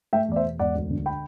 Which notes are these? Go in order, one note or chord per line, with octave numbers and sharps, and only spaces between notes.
A3 E5 G5
E2 D5
C5 E5
B2
E1 D5 F#5
D2
D3
G5 B5